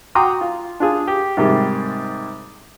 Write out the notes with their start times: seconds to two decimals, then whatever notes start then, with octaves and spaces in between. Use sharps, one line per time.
0.15 F#4 G5 A#5 C6 D6 D#6
0.41 F4
0.80 D4 F4 G#4
1.08 G4
1.37 G#2 C3 D#3 G3 G4 G#4